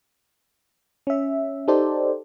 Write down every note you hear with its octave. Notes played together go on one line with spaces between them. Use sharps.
C#4 E5
D#4 G4 A4 C5 D5